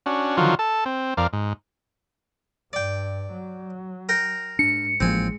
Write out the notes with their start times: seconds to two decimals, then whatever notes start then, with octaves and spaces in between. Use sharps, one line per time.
0.06 C#4 D4 F#4
0.37 D3 D#3 F3 F#3 F4 F#4
0.59 A4 A5
0.85 C4
1.17 F2 A#4 D5 F5
1.33 G#2
2.73 G2 D5 G5
3.33 F#3
4.09 A#4 G5 A#5
4.59 G#2 D4 C#7
5.00 A1 F3 G#3 A#3 C4 G#5